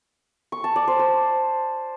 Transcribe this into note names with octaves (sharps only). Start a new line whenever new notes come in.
C#6
A5
D5
C5
C5